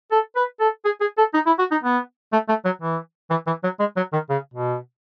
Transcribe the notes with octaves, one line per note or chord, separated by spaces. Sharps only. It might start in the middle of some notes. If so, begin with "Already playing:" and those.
A4
B4
A4
G#4
G#4
A4
D#4
E4
F#4
D#4
B3
A3
A3
F#3
E3
E3
E3
F#3
G#3
F#3
D#3
C#3
B2